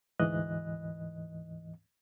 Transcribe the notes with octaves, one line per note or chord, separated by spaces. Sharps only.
D2 G#2 E3 D#5 F#6